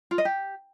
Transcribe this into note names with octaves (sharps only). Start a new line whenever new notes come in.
F4
D#5
G4